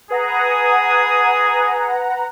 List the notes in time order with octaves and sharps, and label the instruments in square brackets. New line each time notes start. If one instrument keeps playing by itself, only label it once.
[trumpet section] G#4 G#5 D#6 [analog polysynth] B4 F#5 A#5